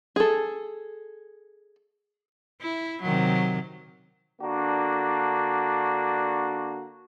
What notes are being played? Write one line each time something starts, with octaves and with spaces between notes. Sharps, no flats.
G#4 A4
E4
C3 D#3 F#3
D3 A#3 D4 F#4